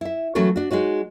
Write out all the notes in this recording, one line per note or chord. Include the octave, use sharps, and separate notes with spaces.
E4 E5
E3 F#3 A3 C#4 F#4 A4
D4 F#4
G#3 D#4 F#4 C#5